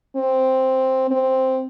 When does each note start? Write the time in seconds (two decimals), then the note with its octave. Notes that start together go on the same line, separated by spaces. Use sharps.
0.16 C4
1.11 C4